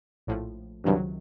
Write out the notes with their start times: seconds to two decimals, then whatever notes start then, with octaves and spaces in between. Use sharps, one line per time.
0.27 A#1 A2 F3
0.85 C#2 G2 C3 D#3 F#3